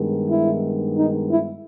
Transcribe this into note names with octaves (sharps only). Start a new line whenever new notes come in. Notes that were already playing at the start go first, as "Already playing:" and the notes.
Already playing: G2 D#3 G#3 B3 D#4
E4
D#4
E4